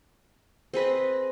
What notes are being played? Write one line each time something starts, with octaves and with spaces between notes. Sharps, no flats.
C4 G#4 B4 D#5